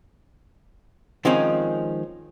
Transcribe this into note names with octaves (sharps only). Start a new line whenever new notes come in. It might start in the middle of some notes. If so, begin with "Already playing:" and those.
D#3 F3 G#3 C4 C#4 D#4